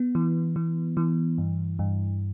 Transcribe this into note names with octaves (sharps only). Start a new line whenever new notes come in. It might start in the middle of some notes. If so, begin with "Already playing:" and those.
Already playing: B3
E3
E3
E3
G2
G2